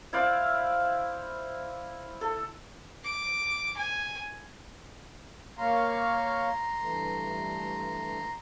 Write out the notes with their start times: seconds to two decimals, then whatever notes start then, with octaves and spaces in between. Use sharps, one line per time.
0.13 E4 C5 D5 F5
2.21 A4
3.03 D6
3.77 G#5
5.57 A#3 C#5 F5 A#5 C6
6.80 G2 E3 A3